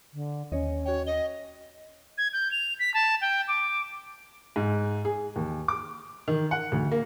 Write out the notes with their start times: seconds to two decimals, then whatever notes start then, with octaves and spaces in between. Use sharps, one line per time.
0.14 D3
0.52 D#2 C#4 C#5 D#5
0.85 F#4 C#5 G5
1.07 D#5 G7
2.18 G#6
2.33 G6
2.51 F7
2.79 B6
2.94 A5
3.21 G5
3.48 D6
4.56 G#2
5.05 G#4
5.36 D#2
5.68 D6
6.28 D#3
6.51 F#5
6.72 D2
6.92 A#3